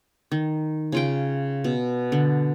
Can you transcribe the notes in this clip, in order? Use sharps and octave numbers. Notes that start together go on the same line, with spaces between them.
D#3
C#3 F4 G5
B2
D3